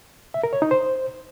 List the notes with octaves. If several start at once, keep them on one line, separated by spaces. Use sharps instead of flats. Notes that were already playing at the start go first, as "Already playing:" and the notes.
E5
A#4
C#5
D#4
C5